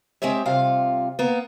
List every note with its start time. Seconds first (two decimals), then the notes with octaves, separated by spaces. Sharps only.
0.22 G#3 C4 G4 C#5 E5
0.45 C3 G3 F4 F5
1.19 A#3 B3